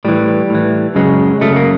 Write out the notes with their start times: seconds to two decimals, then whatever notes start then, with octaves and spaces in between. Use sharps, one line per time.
0.05 A2 E3 G3
0.50 A2 E3
0.95 F#2 C#3 F#3 G#3
1.41 F#2 C#3 F#3 A3
1.56 A#3